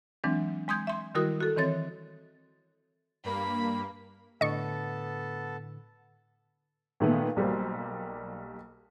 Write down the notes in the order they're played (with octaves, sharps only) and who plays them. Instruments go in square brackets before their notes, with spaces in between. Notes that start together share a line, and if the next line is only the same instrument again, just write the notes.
[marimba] E3 F#3 G#3 C4 D4
G#3 C6 D#6 G6 G#6
E5 C6
D#3 G3 E4 F#4 A#4 D#6
F#4 A4
D#3 E3 C4 C#5 A6
[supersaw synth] G2 A#3 [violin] B5
[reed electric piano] A2 D3 [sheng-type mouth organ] B3 A4 A5 [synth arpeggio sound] D#5 C#6
[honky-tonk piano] A#2 D#3 A3 B3
B1 G3 A#3 C5